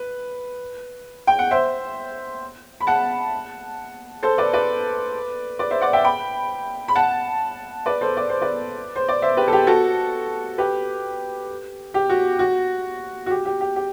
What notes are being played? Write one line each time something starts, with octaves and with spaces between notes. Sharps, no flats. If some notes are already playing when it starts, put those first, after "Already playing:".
Already playing: B4
G5
F#5
C5 E5
B5
F#5 A5
A4 C5
B4 D5
B4 D5
B4 D5
C5 E5
D5 F#5
E5 G5
G5 B5
B5
F#5 A5
B4 D5
A4 C5
D5
C5
B4 D5
C5
D5
C5 E5
G4 B4
A4
G4
F#4 A4
G4 B4
G4
F#4
F#4
F#4
G4
G4
G4
G4